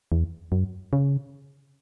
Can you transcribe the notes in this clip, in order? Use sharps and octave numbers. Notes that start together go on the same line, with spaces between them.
E2
F#2
C#3